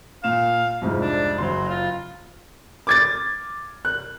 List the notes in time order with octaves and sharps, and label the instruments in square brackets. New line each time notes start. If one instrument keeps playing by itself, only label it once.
[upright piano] A#2 E7 [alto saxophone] F5
[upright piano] C2 F2 G#2
[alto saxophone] D4
[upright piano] F#1 C6 [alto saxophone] F#3
[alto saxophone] F4
[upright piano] D6 G#6 A6
F#6